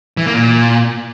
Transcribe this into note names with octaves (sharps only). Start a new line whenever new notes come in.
E3
A#3
A#2